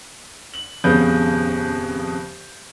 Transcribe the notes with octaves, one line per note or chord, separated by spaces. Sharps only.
F#7
D#1 F2 C#3 B3 B4 G6